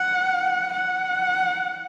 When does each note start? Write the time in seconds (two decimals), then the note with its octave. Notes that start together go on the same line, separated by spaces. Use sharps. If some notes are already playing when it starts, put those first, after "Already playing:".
Already playing: F#5
0.73 F#5